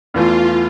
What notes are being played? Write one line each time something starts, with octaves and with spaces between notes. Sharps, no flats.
E2 E3 A3 F4